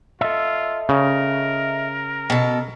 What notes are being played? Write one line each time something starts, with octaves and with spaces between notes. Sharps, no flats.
F4 A4 D#5 E5
C#3 A#4
B2 A4